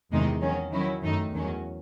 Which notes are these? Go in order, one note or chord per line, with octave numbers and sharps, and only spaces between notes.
E2 C3 D#3 G#3 D#4
D#3 F#3 C#4
D#3 F#3 C#4 E4
F#2 D#3 A3 D#4
E2 D#3 F#3 C#4